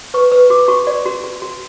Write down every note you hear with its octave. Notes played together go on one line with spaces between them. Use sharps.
B4 C#6
B4 E6
F#4 D6
F#4 C#6
F#4 D5
F#4
F#4
F#4